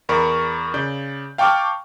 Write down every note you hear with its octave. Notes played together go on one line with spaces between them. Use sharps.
E2 A#4 D5 B5 C#6
C#3 D5 G6
F5 G5 A5 C#6 D6 F6